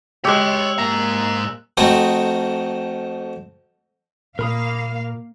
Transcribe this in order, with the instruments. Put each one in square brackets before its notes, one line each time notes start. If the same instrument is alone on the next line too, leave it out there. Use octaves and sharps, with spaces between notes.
[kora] G#3 G4 [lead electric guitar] C#5 C6 [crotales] E6 F#6
[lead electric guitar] G#2 A#5 [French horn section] A#3
[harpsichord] F2 A3 C4 D#4 F#4 D#6
[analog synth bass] A#2 [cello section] A#3 F5 [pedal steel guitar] A#4 B5 D#6